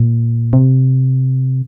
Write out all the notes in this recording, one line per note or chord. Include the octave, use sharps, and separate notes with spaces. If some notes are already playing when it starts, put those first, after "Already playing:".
Already playing: A#2
C3